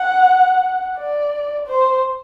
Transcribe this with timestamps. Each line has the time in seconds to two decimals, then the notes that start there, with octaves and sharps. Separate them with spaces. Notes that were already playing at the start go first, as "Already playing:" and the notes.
Already playing: F#5
0.99 D5
1.67 C5